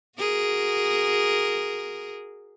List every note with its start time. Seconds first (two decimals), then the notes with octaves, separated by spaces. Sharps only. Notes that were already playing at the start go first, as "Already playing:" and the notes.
0.19 F#4 G#4 A#4